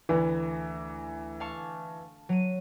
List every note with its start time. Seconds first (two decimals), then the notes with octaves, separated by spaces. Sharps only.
0.09 D2 E3 B4
1.40 F5 A5 C#6
2.29 F#3 D#7